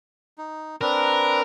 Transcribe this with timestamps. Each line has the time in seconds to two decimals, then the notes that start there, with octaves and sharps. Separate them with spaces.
0.38 D#4
0.81 C4 D4 A#4 B4